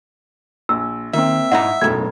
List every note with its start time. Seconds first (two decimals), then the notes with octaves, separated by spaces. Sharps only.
0.69 A#1 E6
1.13 D#3 A#3 C4 E5
1.52 G#2 E4 D#5 F#5 A#5
1.81 E1 B1 F#2 A2 G#6